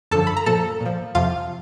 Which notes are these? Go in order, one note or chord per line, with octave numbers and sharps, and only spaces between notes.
F#2 D3 F3 A4 A5
B5
A#5
A#2 F3 A4 A5
A#2 F3
F2 C3 F3 F4 F5